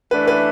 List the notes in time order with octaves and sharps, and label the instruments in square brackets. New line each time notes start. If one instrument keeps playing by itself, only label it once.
[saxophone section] E3 A3 D4 [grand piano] B4
[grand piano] B4